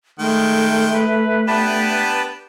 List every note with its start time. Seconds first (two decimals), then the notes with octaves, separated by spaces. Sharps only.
0.19 D#3 G#3 A3 G5
0.93 B4
1.47 B3 D4 G4 B4 A5 B5